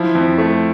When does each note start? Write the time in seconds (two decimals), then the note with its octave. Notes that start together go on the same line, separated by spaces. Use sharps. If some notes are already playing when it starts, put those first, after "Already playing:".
Already playing: F3 E4
0.15 F2
0.38 A3